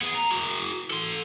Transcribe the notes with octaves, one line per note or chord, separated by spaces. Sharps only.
B3 G#4
A#5
F#4 G#4
A4 C6